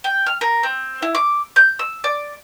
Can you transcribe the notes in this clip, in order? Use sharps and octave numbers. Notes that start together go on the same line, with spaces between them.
G5
F6
A#4
C4
E4
D6
G6
E6
D5